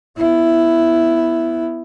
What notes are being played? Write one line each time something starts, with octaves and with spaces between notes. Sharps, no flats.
B3 E4